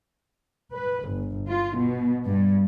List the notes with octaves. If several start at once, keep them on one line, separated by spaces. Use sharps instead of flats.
B4
G1
F4
B2
G2